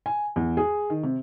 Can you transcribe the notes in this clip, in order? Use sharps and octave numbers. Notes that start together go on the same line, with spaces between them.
G#5
E2
G#4
D#3
C3